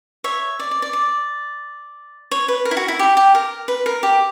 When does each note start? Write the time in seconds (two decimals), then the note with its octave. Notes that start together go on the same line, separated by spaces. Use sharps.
0.24 C#5 E5
0.59 D5
0.71 D5
0.82 D5
0.93 D5
2.31 C#5
2.48 B4
2.65 A#4
2.71 E4
2.77 F#4
2.88 E4
2.99 G4
3.17 G4
3.35 A#4
3.68 B4
3.86 A#4
4.03 G4